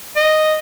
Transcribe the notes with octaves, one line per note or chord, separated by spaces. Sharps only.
D#5